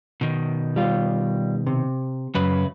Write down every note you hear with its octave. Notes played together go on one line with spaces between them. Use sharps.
B2 D#3
G3 F4
C3
F#2 C#3 B4